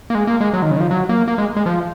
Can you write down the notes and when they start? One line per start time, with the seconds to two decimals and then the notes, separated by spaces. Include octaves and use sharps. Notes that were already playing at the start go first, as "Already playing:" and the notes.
0.10 A#3
0.15 G#3
0.27 A#3
0.40 G#3
0.53 F#3
0.62 D#3
0.71 C#3
0.77 D#3
0.80 F3
0.91 F#3
1.09 A#3
1.28 A#3
1.38 G#3
1.56 G#3
1.66 F3